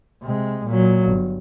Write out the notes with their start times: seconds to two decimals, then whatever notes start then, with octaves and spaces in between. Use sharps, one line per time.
0.22 C3 G#3
0.66 A#2 F#3
1.08 G1